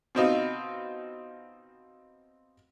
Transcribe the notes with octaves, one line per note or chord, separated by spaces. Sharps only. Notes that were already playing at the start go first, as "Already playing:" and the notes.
B2 C4 D#4 F4